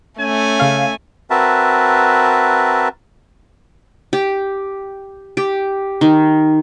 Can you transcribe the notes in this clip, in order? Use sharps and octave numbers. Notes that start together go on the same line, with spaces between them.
A3 C#4 E5 G#5
C#3 F5
C4 F#4 A#4 B4 E5 A5
G4
G4
D#3